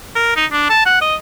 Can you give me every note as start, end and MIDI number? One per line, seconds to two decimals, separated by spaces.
0.15 0.32 70
0.36 0.46 63
0.52 0.66 62
0.70 0.85 81
0.85 1.01 78
1.02 1.15 75